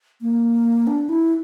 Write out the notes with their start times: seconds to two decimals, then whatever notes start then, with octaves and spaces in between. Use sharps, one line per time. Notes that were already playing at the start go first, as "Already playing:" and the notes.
0.22 A#3
0.87 D4
1.09 E4